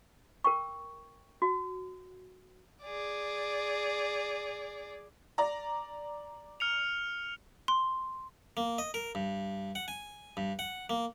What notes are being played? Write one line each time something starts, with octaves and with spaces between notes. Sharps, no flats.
A#4 G5 C#6
F#4
G#4 D5
D5 A#5
F6 C#7 F7
C6
A#3
D#5
A#4
G2
F#5
G#5
G2
F#5
A#3